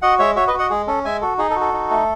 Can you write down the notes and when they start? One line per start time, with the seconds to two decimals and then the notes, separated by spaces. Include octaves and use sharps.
0.02 F#4 D#5 F#5
0.19 G#3 C#5 E5
0.36 F#4 C#5 E5
0.47 B4 D#5
0.53 F#4
0.58 D#5 F#5
0.70 G#3 G#4
0.87 C#4 A4
1.05 G#3 E5 G#5
1.21 F#4 A4
1.38 D#4 G#4
1.50 A4
1.56 F#4
1.61 A4
1.73 D#4
1.90 A3